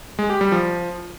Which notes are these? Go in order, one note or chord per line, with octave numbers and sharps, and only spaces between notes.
G#3
G4
G3
F3